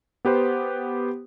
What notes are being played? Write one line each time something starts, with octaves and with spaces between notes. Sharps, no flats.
B3 G4 B4 C5